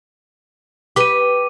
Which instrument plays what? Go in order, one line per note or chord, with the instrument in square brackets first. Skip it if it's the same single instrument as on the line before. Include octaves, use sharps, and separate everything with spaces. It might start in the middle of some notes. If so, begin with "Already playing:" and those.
[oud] G4 B4 [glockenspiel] D6 D#7